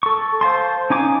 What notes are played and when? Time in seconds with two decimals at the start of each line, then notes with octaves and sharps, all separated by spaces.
0.03 A4 C#6
0.41 C5 F5 A5 C6
0.90 C#4 D#4 G#5 D6